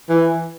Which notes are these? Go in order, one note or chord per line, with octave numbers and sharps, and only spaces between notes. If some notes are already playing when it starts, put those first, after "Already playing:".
E3